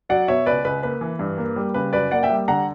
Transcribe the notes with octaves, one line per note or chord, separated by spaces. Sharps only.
F#3 D5 F#5
B2 C#5 E5
C#2 B4 D5
C#2 B4
A#3 B4
E3
G2
A#3
G3
C#3 B4
F#2 B4 D5
A#3 D5 F#5
E5 G5
G3
D3 F#5 A#5